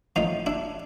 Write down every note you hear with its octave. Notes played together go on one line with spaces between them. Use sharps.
A2 F3 D#4 F4
D4 E4